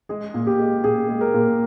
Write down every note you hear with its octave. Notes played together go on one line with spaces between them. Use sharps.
G#3 G#4
A#2
G4
G#3
A#2 G#4
G#3
A#4
A#2